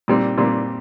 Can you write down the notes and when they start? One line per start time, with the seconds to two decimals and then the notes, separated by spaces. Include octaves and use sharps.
0.08 A#2 G3 C4
0.37 A#2 G3 C4